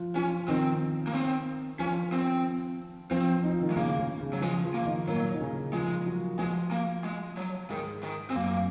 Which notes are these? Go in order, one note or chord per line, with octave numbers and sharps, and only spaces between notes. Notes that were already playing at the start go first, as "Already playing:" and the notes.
Already playing: F3 F4
F3 C#4 F4
D#3 C4 D#4
A#3
C4
F3 C#4 F4
C4
F3 C4 F4
D#4
F4
D#3 D#4
G#3
C#3 A#3 C#4
C#3 C#4
C#3 C#4
F#3
F3 G#3 F4
F3 F4
A#3
D#3 D#4
A#2 F#3 A#3
D#4
C#3 C#4
F3 G#3 F4
F#3 F#4
F3 G#3 F4
A#3
G#3
F#3
G#2 D#3 G#3
D#3
C4
F#2 F#3 A#3